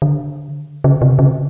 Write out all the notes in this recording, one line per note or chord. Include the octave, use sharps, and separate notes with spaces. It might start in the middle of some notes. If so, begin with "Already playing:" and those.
D3
C#3
C3
C#3